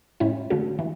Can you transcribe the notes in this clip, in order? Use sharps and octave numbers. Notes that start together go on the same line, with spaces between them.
A2 G#3 C#4 E4
D3 A3 C#4 F#4
E3